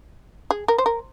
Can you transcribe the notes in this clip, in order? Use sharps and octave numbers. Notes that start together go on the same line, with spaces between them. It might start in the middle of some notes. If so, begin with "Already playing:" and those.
G#4
A#4
C5
A#4